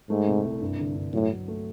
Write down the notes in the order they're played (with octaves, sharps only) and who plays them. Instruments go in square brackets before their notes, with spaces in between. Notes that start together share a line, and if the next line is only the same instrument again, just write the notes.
[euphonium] G#2 [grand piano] A3
[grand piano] C3
C2
G2
D3
G2
[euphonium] A2 [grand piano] F#3
[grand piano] F#3
A3